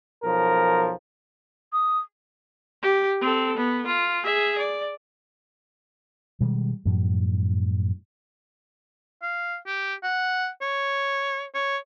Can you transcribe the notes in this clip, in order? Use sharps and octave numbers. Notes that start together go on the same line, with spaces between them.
B1 F3 A#4
D#6
G4
C4 A4
B3
F4
G#4 E5
D5
B2 D#3 G3 G#3
F#2 A2 F3 G3
F5
G4
F#5
C#5
C#5